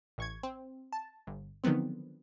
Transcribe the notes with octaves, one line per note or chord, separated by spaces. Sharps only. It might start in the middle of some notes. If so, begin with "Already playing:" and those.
A1 C#6 G#6
C4
A5
G1
D3 D#3 F3 F#3 B3 C4